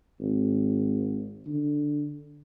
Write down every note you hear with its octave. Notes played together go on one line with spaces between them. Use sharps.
G#1
D3